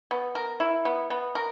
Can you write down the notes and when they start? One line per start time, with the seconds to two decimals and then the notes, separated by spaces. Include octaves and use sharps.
0.11 B3
0.35 A#4
0.60 E4
0.85 B3
1.10 B3
1.35 A#4